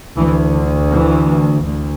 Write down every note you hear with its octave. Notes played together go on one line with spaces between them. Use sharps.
D2 E3
D3
E3
D2